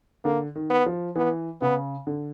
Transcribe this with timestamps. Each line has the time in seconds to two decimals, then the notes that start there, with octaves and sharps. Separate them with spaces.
0.25 D3 A#3
0.55 D#3
0.70 B3
0.86 F3
1.16 E3 B3
1.61 C#3 B3
2.07 D3